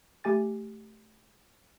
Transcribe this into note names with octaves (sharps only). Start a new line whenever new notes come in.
A3 G4 G#5 A6